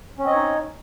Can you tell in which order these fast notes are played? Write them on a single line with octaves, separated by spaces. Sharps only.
C#4 C4 D#5 C#5 D#4